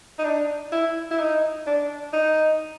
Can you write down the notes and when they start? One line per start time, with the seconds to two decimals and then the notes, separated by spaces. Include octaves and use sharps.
0.19 D#4
0.25 D4
0.72 E4
1.11 E4
1.20 D#4
1.67 D4
2.13 D#4